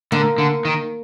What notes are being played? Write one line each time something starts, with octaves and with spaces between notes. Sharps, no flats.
D3 A#3
D3
D#3